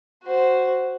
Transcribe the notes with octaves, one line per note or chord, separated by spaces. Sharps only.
F#4 C5